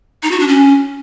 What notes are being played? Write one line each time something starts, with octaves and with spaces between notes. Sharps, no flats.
D#4
F#4
D4
C#4